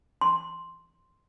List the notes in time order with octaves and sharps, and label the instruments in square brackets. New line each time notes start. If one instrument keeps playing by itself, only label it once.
[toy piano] C6